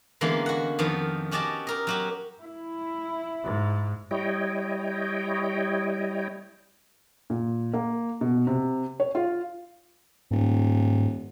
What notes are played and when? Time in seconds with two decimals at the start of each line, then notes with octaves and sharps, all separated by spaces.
0.21 D3 E3 G#3 A#3 B3 C#4
0.46 F#4 F#5
0.79 F2 D#3 F3 B3
1.31 C#4 F#4 G4 D5 D#5 A5
1.67 G4 A#4 D#5
1.87 F#3 F#4 G4
2.41 E4
3.44 G#2
4.11 G3 E4 C#5 D#5 G5
7.30 A#2
7.74 A#3
8.21 B2
8.47 C3
9.00 C#5
9.15 F4
10.31 D#1 G#2